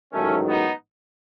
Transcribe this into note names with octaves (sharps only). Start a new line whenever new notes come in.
A1 G#2 D#3 F#3 A3 C#4
B3 D#4